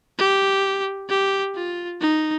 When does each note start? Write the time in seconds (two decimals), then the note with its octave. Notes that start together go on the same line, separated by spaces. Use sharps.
0.18 G4
1.09 G4
1.55 F4
2.01 D#4